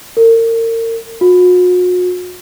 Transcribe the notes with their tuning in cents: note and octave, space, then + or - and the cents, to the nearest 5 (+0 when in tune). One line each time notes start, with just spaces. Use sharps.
A#4 -35
F#4 -40